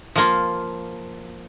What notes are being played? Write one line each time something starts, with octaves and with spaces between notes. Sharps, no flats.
F3 A#3 F4